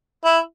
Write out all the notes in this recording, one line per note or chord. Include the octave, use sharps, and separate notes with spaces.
E4